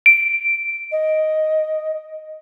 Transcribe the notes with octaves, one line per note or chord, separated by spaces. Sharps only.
D7
D#5